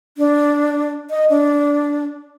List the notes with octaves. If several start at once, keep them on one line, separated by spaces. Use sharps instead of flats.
D4
D#5
D4